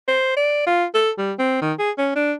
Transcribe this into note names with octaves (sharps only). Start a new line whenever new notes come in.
C5
D5
F4
A4
G3
C4
D#3
G#4
C#4
D4